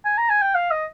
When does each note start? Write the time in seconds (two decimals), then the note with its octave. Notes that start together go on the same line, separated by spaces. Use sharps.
0.05 G#5
0.17 A#5
0.29 G#5
0.42 G5
0.55 F5
0.71 D#5